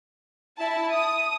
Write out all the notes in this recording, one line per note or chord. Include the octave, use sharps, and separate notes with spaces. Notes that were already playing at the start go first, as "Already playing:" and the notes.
E4 A5
D#6